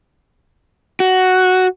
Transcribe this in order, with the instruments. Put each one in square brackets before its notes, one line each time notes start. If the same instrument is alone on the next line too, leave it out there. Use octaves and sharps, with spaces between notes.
[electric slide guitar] F#4